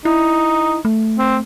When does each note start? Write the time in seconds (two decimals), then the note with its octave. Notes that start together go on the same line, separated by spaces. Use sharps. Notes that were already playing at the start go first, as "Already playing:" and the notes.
0.05 D#4 E4
0.85 A3
1.18 C4